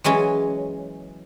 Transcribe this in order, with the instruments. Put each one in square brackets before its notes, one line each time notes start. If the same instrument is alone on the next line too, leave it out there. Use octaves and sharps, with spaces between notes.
[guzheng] E3 F#3 G#3 C#4